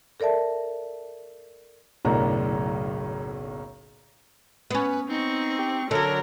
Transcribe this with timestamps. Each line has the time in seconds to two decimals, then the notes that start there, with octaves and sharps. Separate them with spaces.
0.20 A4 A#4 D5 E5 A5
2.05 F#1 B1 A2 D4 A#4 A#5
4.71 B3 C#4 B4
5.09 C4 D#4 C#6
5.59 G4
5.91 D3 F#3 A4 A#4 C#5